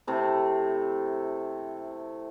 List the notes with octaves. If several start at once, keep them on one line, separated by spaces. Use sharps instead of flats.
C3 A3 E4